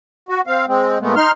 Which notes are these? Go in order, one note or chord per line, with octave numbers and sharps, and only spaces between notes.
F#4
C4 F5
G#3 C4
A#2 G#3 A3 B3
D#4 C6 F6